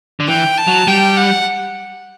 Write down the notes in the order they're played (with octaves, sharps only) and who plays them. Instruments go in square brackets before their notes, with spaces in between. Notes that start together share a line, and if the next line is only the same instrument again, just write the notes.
[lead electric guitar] D3
[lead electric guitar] E3 [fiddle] G5
[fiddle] A5
[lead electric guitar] F#3
[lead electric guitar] G3 [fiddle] G5
[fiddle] F#5